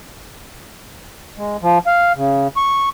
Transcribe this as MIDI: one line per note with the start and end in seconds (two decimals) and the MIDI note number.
1.38 1.57 56
1.62 1.78 53
1.87 2.12 77
2.16 2.48 49
2.57 2.89 85